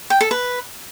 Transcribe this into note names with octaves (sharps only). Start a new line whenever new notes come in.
G5
A4
B4